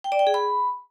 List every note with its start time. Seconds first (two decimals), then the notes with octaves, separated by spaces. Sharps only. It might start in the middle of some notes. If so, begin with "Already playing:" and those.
0.04 G5
0.12 D5
0.19 G5
0.27 G#4
0.34 B5